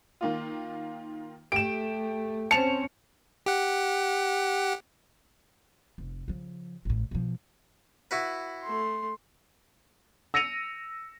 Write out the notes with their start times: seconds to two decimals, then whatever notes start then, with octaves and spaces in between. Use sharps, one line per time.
0.21 D#3 A#3 F4
1.52 A3 G4 D7 E7
2.51 C4 C#4 A5 C#7 F7
3.46 G4 F#5
5.98 F1
6.28 C#3 F3
6.85 A1 A2
7.11 B2 F3
8.11 E4 F#4 B4
8.64 A3 C6
10.34 E6 A#6 C#7 D#7 F7